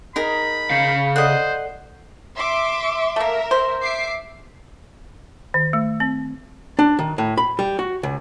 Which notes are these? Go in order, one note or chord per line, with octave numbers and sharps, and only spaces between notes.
D#4 G#4 A#4 B5
C#3 F5 G6 B6 C#7
A4 C5 D5 D#5 F#5
E5 C6 D6
A3 A#3 A#4 E5
C5
E5 D6 C7
D#3
A3
C4
D4
D#3
A2
B5
G3
F#4
C#2